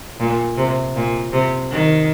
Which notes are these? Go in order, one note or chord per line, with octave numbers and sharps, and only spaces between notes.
A#2
C3
A#2
C3
D#3